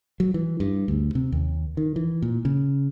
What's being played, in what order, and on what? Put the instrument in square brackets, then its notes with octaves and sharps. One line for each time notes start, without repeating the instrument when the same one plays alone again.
[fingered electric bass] F#3
E3
G2
D2
C3
D#2
D#3
E3
A#2
C#3